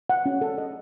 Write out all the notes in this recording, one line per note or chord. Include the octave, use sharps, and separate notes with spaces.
F#5
C#4
A4
D#5